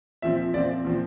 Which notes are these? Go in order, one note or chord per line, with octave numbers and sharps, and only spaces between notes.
A#2 F3 C4 E5
A#2 F3 C4 D5
A#2 F3 C4